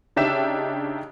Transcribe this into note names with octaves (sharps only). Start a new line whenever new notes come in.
C#3 D4 D#4 G4 E5 E7